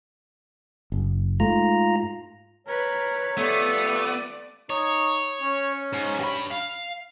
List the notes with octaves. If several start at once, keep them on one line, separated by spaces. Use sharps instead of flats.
F#1
G#2 A3 F4 A#5
A#4 B4 C#5
F3 G3 A3 B3 D5
D#4 C#5
C#4
G#2
G2 B5
F5